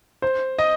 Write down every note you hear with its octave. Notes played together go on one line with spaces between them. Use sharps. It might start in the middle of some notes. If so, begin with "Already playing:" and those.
C5
D#5